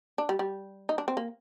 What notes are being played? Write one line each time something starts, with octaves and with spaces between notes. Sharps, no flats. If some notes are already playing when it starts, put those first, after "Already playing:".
D4
G3
G3
D#4
D4
C4
A#3